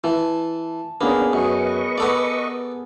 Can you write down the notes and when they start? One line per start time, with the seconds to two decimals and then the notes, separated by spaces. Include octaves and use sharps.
0.04 E3 A5
1.01 A#3 B3 C#4 D4 G#4 A#4
1.33 F#2 B4 D#5 C#6
1.98 B3 A4 D5 D#6